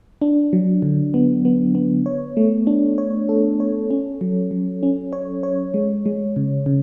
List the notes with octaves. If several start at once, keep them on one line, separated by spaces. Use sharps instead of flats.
D4
F#3
D3
B3
B3
B3
C#5
A3
D4
C#5
A4
C#5
C#4
F#3
F#3
C#4
C#5
C#5
G#3
G#3
C#3
C#3